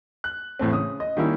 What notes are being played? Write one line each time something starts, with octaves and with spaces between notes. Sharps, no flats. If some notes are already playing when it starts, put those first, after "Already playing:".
F#6
A1 A2 A3 C4
C#3 D#6
D#5
D#3 G3 A#3 C#4 E4